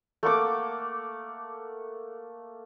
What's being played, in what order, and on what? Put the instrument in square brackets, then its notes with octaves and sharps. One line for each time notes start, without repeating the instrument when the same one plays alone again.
[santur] A3 A#3 F#5 D6